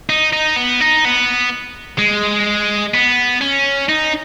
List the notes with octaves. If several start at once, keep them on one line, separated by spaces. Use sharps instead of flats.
D#4
D#4
B3
D#4
B3
G#3
B3
C#4
D#4